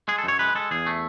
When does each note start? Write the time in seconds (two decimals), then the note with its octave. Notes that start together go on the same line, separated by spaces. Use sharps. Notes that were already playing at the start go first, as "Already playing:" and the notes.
0.08 G#3 G#4
0.18 A4
0.24 F#2 C#5
0.39 G#3 B4
0.55 G#3 A4
0.71 E2 G#4
0.86 A3